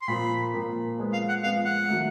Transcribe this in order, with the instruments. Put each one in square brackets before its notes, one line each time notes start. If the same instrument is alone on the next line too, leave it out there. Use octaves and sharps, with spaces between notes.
[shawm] C6
[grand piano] A#2 F3 A#3 [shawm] B5
[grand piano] A#2 F3 A#3
F3 G#3 B3
[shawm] F5
F#5
[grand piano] F3 G#3 B3 [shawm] F5
[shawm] F#5
[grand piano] D#3 F#3 A3